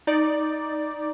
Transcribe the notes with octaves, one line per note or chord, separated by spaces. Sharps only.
D#4 D5